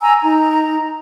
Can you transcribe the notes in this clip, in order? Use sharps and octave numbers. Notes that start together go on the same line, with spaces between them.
G#5 A#5 E6
D#4 A#5